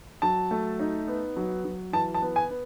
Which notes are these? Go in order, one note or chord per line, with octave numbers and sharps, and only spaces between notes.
F#3 A5
A3
D#4
B3
F#3
F#3
E3 A5
A5
B3
G#5
B3